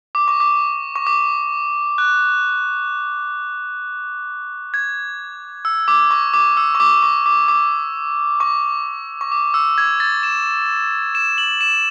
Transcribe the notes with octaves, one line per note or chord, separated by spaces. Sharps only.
D6
C#6
D6
C#6
D6
F#6
G#6
E6
D6
C#6
D6
E6
C#6
D6
C#6
D6
D6
C#6
C#6
D6
E6
G#6
A6
E7
E7
F#7
E7